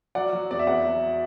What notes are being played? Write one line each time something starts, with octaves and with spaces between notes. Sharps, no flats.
F#3 D5 F#5
F#3
E2 D5
E5
E2 D5 F#5
F#3